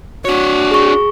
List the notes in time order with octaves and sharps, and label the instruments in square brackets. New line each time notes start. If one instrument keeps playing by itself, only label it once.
[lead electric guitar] D4 C#5 [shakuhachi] F#4
[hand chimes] G#4 C#6